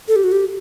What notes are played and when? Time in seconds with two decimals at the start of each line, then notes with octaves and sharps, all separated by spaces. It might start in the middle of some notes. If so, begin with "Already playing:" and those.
0.08 A4
0.16 G4
0.24 F#4
0.32 G4